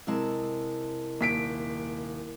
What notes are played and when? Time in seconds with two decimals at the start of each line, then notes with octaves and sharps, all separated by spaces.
0.07 C3 G#3 E4 A#4 A5
1.21 D#1 B6 D7